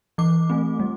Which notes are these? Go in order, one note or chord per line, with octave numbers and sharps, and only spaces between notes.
E3 D6
A3 C4
G3